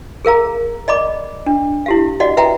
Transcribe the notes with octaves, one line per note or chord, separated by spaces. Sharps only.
G#4 A#4 F5 A#5
D5 D#5 B5 D6
D4
E4 G4 F5
F#4 D5 D#5 F#5
B4 E5 F#5 G5 A#5